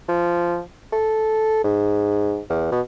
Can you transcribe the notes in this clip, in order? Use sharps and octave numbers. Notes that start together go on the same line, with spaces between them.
F3
A4
G#2
E2
B2